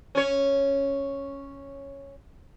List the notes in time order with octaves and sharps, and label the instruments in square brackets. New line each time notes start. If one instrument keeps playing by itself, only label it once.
[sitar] C#4 C#5